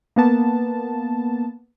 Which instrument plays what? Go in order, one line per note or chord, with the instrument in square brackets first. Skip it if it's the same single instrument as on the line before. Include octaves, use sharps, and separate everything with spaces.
[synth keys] A#3 B3 A5